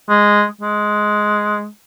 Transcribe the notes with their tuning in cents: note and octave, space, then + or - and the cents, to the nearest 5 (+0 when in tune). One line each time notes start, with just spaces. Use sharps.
G#3 -5
G#3 +10